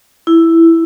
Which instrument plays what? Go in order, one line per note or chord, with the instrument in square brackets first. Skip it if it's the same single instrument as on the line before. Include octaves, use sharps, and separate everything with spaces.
[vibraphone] E4